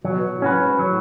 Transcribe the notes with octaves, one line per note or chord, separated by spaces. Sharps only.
B2 F#3
B2
A2
C#4 F#4 B4
G#2
A2 F#3